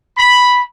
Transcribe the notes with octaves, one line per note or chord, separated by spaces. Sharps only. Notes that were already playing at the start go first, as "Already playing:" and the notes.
B5